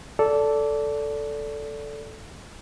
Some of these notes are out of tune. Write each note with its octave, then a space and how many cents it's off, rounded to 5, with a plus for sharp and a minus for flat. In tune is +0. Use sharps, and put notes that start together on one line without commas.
A4 +0 D5 -20